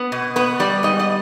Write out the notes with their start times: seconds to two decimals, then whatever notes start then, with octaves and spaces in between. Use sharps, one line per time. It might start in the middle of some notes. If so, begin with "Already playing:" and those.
Already playing: B3
0.12 B2
0.36 B3 B4
0.60 G3 D5
0.83 G#2 D#5
0.99 D#5